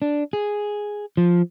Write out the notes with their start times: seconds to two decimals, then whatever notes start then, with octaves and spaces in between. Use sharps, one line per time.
0.02 D4
0.33 G#4
1.17 F3